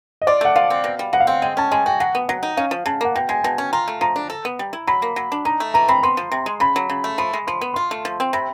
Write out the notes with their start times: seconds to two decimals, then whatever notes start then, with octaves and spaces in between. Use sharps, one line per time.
0.22 D#5
0.27 F4 D5
0.41 A3 F#5
0.56 F3 F5
0.70 C4
0.84 B2
0.99 G3
1.13 B2 F#5
1.20 F5
1.27 C4 F#5
1.42 G#3 G5
1.57 C#4 A5
1.71 G#3 G#5
1.86 F#4 G5
2.00 F#3 F#5
2.15 B3
2.29 F#3 F#5
2.43 D#4
2.57 C#4 F5
2.71 F3
2.86 C#3 A5
3.01 A#3 F#5
3.15 B2 G5
3.29 G#3 G#5
3.44 B2 A5
3.58 C#4
3.72 F4 A#5
3.88 A3
4.01 F3 A#5
4.16 D4
4.30 A4
4.45 B3
4.59 G3
4.73 E4
4.87 F#3 B5
5.02 A#3
5.16 F#3
5.32 D4
5.45 D#4 A#5
5.60 A3
5.74 E3 A#5
5.88 C4 B5
6.03 B3 C6
6.17 F3
6.32 C3
6.46 G#3
6.60 C#3 B5
6.76 F#3
6.90 C#3
7.04 A3
7.18 F3 B5
7.33 G#3
7.47 F3 C6
7.61 B3
7.74 F4 C6
7.91 A3
8.05 F3
8.20 C4
8.33 C3 B5